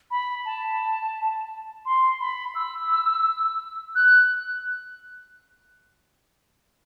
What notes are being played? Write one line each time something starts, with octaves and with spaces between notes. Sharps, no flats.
B5
A5
C6
B5
E6
F#6